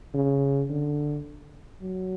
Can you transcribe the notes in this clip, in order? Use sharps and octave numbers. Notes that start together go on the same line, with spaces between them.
C#3
D3
F#3